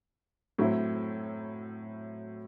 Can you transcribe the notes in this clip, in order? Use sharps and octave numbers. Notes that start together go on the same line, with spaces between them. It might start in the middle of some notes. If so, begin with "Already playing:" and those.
A2 F#3 C4 E4